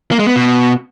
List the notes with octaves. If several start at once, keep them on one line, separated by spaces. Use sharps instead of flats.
A#3
G#3
B3
B2